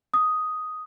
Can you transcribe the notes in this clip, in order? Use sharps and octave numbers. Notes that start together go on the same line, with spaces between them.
D#6